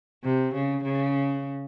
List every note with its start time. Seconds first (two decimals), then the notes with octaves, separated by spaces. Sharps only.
0.24 C3
0.54 C#3
0.84 C#3